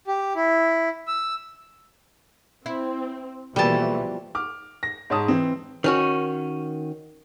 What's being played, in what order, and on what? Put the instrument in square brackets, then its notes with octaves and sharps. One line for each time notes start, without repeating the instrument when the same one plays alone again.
[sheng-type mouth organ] G4
E4
E6
[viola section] C4 [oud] E4
[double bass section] B2 F3 [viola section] E3 [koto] G3 A5 [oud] A3 A#3
[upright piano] D6 F6
A#6
G#2 C#5 A5 D#6
E3 C4
[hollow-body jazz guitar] D#3 C#4 F#4